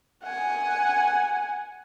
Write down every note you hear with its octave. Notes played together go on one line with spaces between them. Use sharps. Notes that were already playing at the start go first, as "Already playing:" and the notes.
F#5 G#5